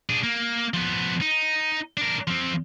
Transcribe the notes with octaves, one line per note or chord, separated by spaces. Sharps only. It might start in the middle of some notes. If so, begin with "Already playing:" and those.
D4 G#4
A#3
F3 B3
D#4
D4 A#4
F3 C4